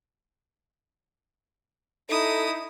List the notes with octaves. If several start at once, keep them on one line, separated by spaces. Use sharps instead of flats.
D#4 E4 A4 D#6